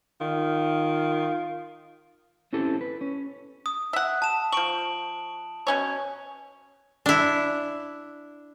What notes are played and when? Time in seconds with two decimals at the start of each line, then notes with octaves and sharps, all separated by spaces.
0.21 D#3 F4
2.53 C4 C#4 E4 G4 A4
2.81 B4
3.01 C#4
3.66 D#6
3.93 E5 F#5
4.22 A5 E7
4.52 F3 C#6 D7 F#7
5.67 B2 C#4 C#5
7.06 D4 E4